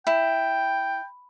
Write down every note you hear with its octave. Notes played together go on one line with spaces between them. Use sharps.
E4 G5